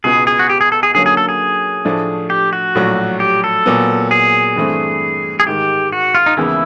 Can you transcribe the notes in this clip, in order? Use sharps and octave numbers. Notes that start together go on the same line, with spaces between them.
C#2 B2 G#3 B3 G#4
G#4
F#4
G4
G#4
A4
G#4
D3 F#3 A#3 C#4 G#4
G#4
A4
G#4
A2 F3 A3 D4
G4
F#4
A#1 A2 F#3
G4
A4
A#2 F#3 B3
G#4
G2 E3 A3 C4
G#4
G#2 D#3 G#3 G4
F#4
F4
D#4
D#2 C#3 E3 G#3 B3 E4